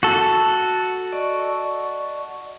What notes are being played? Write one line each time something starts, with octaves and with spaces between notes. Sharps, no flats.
F#4 A4
D5 D#5 C#6